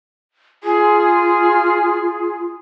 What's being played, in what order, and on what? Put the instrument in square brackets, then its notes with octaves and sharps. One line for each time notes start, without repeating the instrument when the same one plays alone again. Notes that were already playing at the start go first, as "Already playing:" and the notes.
[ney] F4 [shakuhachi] G#4